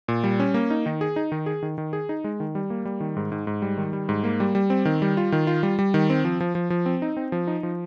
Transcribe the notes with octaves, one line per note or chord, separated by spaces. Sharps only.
A#2
G3
C#4
A#3
D#4
D#3
G#4
D#4
D#3
G#4
D#3
D#3
G#4
D#4
G#3
D#3
G3
A#3
G3
D#3
G#2
G#2
G#2
G3
D#3
G3
G#2
A#3
G3
G3
C4
D#3
G3
F4
D#3
F4
G3
G3
D#3
C4
F3
F3
F3
F3
C4
D#4
C4
F3
D#4
F3